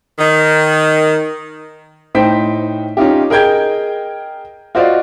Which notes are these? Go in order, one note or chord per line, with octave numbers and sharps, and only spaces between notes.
D#3
A2 D#4 C5 G5 B6
C#4 D#4 F4 G4
G#4 A#4 D#5 G5 G6 G#6
F4 F#4 C5 D5 D#5 F5